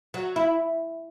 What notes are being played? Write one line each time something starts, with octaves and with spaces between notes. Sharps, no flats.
F#3
E4